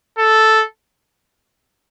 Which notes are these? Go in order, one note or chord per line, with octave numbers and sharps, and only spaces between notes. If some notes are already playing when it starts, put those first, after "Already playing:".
A4